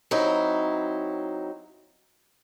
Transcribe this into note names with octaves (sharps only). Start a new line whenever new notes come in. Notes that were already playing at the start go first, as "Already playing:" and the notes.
F#3 C4 D#4 E4